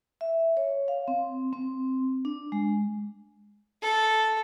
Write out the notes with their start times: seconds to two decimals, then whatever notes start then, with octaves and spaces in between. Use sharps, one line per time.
0.21 E5
0.57 C#5
0.88 F5
1.08 C4
1.53 C4
2.25 D4
2.52 G#3
3.82 A4